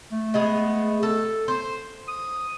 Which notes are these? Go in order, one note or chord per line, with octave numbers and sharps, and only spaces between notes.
A3
G#3 B3 G#4
A4
C5
D#6